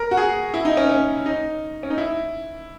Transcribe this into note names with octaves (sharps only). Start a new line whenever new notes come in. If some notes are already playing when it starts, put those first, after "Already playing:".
Already playing: A#4
F#4
G#4
E4
D#4
C#4
C#4
D#4
C#4
D#4
E4